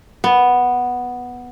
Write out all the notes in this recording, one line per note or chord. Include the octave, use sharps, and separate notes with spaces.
B3